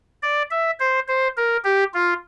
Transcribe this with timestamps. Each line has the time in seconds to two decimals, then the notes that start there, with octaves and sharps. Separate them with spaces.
0.23 D5
0.51 E5
0.80 C5
1.08 C5
1.37 A#4
1.64 G4
1.94 F4